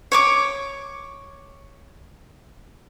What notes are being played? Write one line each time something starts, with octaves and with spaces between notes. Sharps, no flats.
C#5 C#6 D6